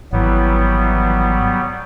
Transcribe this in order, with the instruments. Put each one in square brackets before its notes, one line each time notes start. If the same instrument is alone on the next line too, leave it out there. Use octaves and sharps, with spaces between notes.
[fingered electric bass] G#1 [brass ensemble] E3 [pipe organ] F#3 G3 B3